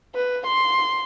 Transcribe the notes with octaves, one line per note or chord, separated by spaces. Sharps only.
B4
C6